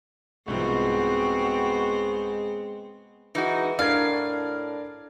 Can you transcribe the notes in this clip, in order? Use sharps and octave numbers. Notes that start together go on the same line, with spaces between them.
C2 G#2 F3 G#3 B3 C4 F#4
E3 G#3 D#4 F#4
A2 D4 A#4 F5 G#6